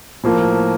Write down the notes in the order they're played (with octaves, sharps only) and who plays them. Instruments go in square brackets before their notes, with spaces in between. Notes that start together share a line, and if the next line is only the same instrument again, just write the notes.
[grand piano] A2 F3 A#3